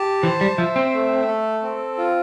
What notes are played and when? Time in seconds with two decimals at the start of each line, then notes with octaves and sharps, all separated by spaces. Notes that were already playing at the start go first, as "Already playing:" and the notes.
Already playing: G4 A5
0.23 E3 C5
0.41 G3
0.58 F3 E5
0.76 C4
0.93 A3
1.28 A4
1.63 C4
1.98 F4